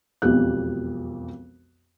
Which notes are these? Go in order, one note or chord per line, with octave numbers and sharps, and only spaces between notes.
E1 B1 F2 G4 F#6